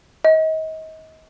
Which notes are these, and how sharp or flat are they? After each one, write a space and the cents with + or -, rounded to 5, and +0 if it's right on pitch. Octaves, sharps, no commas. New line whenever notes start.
D#5 +30